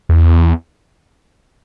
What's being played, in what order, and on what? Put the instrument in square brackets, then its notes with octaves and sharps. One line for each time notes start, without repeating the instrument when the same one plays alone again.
[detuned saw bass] E2